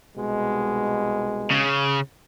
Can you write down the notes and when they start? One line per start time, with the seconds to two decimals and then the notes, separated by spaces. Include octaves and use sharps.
0.17 C2 B2 G#3
1.51 C#3